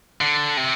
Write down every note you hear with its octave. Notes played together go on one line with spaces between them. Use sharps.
D3
C3